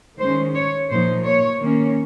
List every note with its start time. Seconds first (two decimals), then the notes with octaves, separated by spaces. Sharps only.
0.19 D#3 G#3 C#4 C5
0.55 C#5
0.90 A#2 F3 A#3 D#4 C5
1.25 C#5
1.60 D#3 A#3 C#4